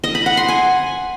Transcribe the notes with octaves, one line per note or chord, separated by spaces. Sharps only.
D#5
B5
F#5
C6
G#5